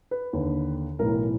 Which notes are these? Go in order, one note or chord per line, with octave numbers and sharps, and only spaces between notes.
B4
D#2 D3
B1 A2 E3 A#4